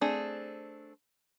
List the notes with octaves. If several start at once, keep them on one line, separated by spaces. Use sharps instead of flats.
A3 C4 D4 G#4